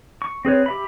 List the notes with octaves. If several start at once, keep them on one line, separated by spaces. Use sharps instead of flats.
C#6
C4 G#4 B4 C#5
G4 E5 B5